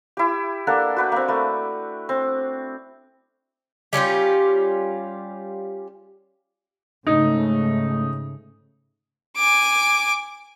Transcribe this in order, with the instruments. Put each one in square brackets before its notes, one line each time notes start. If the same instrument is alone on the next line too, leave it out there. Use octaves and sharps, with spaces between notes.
[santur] E4 G4
A#3 D4 A4 F#5
F#4 B4 G5
A#3 C4
A3 B4
C4
[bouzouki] G3 C#4 F4 G4
[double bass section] G#2 C#3 A3 [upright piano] D#4
[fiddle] G#5 D6